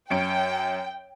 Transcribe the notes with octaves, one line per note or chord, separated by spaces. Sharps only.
F#2 C#4 G5 D7